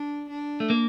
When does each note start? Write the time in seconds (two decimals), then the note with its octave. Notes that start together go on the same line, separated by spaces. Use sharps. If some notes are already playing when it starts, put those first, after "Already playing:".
Already playing: D4
0.29 D4
0.60 A3
0.70 A#3